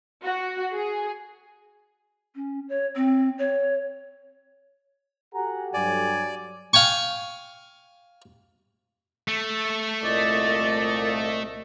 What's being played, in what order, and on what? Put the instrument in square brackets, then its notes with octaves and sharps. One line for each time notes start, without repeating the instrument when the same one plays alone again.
[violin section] F#4
G#4
[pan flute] C#4
C#5
C4
C#5
[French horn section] F#4 G4 A4 [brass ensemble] F#5 G#5 A#5
[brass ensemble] G2 F#3 [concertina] D5 [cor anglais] G#5
[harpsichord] F5 G5 G#5 C#6
[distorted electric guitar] A3
[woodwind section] C2 A#2 D#5 [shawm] D5